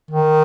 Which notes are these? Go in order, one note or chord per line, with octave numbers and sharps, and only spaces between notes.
D#3